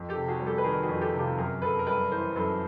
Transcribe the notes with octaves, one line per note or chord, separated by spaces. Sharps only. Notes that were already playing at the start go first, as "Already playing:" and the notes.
Already playing: F2
G4 A4
C3
F#4 G#4
G3
G4 A4
B4
D#3 G#4 A#4
F#4 G#4
F2
G4 A4
C3
F4 G4
F#2 G#4 A#4
C#3 A4 B4
A#4
G3 A4 B4
E3 A#4 C5
F#2 A4 B4